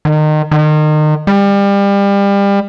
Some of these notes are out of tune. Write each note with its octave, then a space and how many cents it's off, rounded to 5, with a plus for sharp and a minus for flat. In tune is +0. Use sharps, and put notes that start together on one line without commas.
D#3 -25
D#3 -30
G3 +30